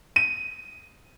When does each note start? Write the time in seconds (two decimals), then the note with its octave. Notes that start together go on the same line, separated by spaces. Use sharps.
0.16 D#7